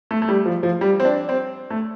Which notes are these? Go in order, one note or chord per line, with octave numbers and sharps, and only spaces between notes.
A3
A3
G3
F3
F3
G3
C4
D4
C4
A3